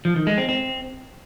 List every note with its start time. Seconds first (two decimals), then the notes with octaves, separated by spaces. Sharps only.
0.05 F3
0.16 D#3
0.27 G#3
0.38 C4
0.49 C4